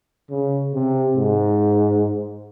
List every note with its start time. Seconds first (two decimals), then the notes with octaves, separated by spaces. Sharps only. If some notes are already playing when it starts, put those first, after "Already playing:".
0.30 C#3
0.74 C3
1.16 G#2